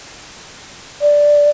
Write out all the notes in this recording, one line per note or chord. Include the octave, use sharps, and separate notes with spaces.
D5